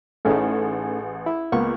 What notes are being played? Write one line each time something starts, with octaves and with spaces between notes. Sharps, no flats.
A1 A3 C#4 D#4 G#4 A4
E4
C#2 A#3 B3 C#6